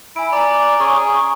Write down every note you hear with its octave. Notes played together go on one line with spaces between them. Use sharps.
E4 G#5 D7
D5 G#5 A#5
C#4 G#4 C#6
G#4